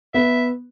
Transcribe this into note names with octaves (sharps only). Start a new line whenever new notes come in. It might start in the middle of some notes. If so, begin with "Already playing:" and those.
B3 E5